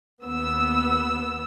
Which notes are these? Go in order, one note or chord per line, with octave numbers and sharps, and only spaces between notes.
D#2 B3 E6